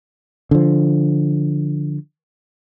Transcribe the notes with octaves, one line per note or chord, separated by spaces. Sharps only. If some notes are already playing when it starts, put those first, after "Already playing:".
D3 F3